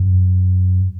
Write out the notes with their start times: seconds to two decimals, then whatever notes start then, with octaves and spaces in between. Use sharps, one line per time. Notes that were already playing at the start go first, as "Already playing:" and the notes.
Already playing: F#2